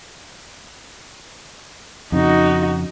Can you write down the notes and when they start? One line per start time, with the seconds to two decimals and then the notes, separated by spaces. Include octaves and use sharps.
2.12 F2 C#3 D#4 F#4